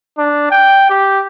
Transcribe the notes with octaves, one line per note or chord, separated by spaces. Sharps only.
D4
G5
G4